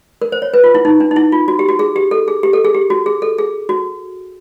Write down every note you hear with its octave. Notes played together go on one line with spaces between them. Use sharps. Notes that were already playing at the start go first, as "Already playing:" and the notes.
A#4
C5
C#5
B4
F4
E4
D#4
D4
D#4
E4
F4
F#4
G4
F#4
G#4
G4
A4
G#4
G4
A4
G#4
G4
F#4
G#4
A4
G#4
F#4